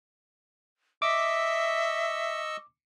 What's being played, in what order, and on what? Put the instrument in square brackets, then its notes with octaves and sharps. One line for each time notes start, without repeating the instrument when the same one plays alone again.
[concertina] D#5 C#6 E6 [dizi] E5 [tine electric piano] D6